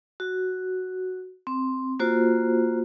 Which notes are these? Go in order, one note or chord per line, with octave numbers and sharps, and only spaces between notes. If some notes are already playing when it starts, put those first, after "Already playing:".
F#4
C4
A#3 F4 F#4 C5